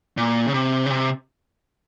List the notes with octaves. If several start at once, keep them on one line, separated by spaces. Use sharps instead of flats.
A#2
C#3
C3
C#3
C3